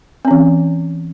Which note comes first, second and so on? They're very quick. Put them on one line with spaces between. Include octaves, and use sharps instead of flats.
C4 C#4 E3